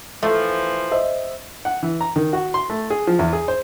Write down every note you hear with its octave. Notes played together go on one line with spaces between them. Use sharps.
E3 F3 A3 F5
C5 D#5 E5
F#5
E3
A#5
D#3
F#4
C6
A3
G#4
F3
E2
G#4
C5